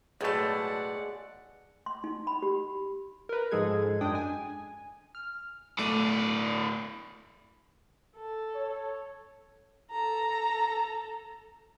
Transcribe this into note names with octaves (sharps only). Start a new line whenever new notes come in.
B1 A2 G#3 A3 D5 F#5 A5
C6
D#4
B5
G4
A#4 B4
G#2 F3 G#3 G#4 A4 G#6
F#2 G#3 D4 G5 D#6
G#5
F6
B1 A2 A3 D5 D#7
A4
C#5
A4 A#5